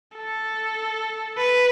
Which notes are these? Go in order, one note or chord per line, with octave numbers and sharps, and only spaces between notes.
A4
B4